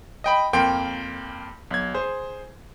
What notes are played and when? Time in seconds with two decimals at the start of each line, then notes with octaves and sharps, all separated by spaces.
0.24 D#5 G5 B5
0.53 F2 A#3 A#4 G5 C6
1.71 B1 G#6
1.94 G#4 C5